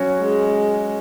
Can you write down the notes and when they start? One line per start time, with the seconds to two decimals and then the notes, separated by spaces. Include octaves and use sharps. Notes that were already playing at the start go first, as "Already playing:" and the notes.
Already playing: F#3 C#4 F#4
0.20 G#3